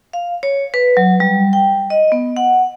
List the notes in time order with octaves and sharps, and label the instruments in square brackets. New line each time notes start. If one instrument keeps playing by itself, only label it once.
[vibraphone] F5
C#5
B4
F#3
G3
G5
D#5
B3
F#5